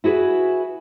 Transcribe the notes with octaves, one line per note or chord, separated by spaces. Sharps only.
E4 F#4 G#4 B4